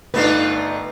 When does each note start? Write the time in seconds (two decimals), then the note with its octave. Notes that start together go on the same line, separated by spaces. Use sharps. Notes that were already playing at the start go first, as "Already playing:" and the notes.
0.14 G1 A3 B3 D4 D#4 F4 B4